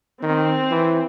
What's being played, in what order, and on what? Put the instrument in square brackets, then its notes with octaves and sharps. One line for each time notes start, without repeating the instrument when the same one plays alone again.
[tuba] D#3 [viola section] C4
[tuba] E3